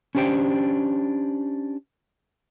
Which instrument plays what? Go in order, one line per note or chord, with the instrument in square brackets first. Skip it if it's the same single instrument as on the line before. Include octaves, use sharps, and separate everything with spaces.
[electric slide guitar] C#4 D4 G4 C5 G5